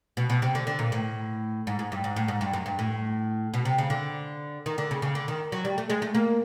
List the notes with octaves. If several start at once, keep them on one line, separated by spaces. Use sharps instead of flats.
B2
B2
C3
D3
D3
A#2
A2
G#2
G#2
G2
G#2
A2
G#2
G2
F#2
G2
A2
B2
C3
C#3
D3
D#3
D3
C#3
C#3
D3
D#3
F#3
G3
A3
G#3
A3
A#3